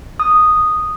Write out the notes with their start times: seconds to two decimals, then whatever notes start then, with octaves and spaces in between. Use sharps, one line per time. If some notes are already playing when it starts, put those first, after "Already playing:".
0.20 D#6